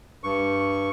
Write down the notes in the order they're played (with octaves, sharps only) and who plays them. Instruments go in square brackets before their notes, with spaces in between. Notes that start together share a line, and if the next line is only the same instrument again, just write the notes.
[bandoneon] G2 C#6